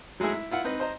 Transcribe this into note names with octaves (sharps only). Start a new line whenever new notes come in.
F#3 G#3 A3 E4 G#4
E4
E4 F4 F#5
C4 D#4 B4
C5 D#5 A#5